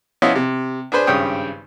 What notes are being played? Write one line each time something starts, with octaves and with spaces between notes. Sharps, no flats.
F3 B3 C#4 E4 D#5 F5
C3
D4 G#4 B4 C5
G#1 G2 C#3 C#5 G5 D#6